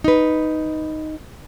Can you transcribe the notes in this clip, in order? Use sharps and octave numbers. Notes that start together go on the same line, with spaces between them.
D#4 B4